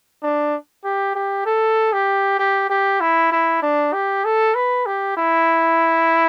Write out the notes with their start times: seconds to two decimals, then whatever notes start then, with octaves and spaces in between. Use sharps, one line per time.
0.23 D4
0.84 G4
1.15 G4
1.46 A4
1.93 G4
2.39 G4
2.70 G4
3.01 E4
3.32 E4
3.63 D4
3.93 G4
4.25 A4
4.55 B4
4.86 G4
5.17 E4